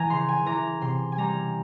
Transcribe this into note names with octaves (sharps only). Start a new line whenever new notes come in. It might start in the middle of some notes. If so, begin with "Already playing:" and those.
Already playing: E3 G#5 A#5
C#3 C6
G#5
E3 A#5
C3 C6
G#5
G3 A#5